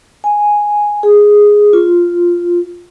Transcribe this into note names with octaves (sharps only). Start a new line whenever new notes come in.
G#5
G#4
F4